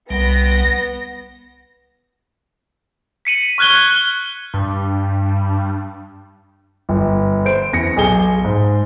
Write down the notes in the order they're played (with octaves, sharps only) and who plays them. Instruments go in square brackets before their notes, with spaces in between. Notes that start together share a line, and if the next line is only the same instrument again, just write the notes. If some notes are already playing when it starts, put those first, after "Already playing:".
[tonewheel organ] C2 G3 [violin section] B3 A#6
[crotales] B6 C#7 D#7 F#7
C#6 F6 F#6 G#6 G7
[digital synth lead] G2
[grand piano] G1
C5 D7
E2 A#6 C#7
B1 G#4 G7
G#2